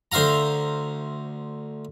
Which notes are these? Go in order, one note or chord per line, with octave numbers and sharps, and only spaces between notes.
D2 C5 E5 F5 A#5